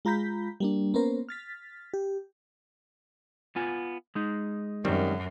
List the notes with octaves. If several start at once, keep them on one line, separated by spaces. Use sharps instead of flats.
G#3 F4 A#5 B5 G6 B6
G3 A#3 D4
A#3 B3 C#4 A#4 C5
F6 A6 B6
G4
B3 F4 G#5
G#3 D#4
F#2 D#3 G3 C4